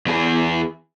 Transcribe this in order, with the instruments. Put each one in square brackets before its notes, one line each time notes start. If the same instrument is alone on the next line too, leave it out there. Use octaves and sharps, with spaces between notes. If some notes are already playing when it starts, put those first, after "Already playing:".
[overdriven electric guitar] E2 G#4